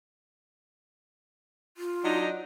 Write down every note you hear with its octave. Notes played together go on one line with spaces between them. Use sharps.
F4
F#3 D4 D#4